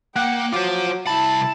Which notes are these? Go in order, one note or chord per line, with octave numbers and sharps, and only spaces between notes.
A#3 F#5 G5
F#3 F4 C5 D6
C2 E4 A5 B5